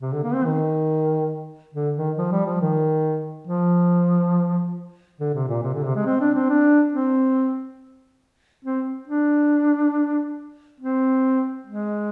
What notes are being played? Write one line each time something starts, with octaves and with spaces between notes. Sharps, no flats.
C3
D3
A#3
C4
D#3
D3
D#3
F3
G3
F3
D#3
F3
D3
C3
A#2
C3
D3
C3
G#3
C4
D4
C4
D4
C4
C4
D4
C4
G#3